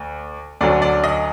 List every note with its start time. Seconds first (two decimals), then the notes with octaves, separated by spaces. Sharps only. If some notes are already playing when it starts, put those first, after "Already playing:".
Already playing: D2
0.61 D2 D3 F#3 D5
0.82 D5
1.04 D#5